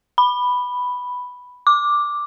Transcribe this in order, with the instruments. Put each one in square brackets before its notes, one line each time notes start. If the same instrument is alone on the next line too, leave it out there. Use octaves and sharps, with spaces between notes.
[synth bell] B5
D6